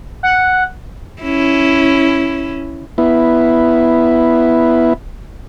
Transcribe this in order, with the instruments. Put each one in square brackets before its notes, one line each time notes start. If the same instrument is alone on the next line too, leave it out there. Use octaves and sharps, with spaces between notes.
[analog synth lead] F#5
[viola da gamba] C#4 E4
[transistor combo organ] B3 E4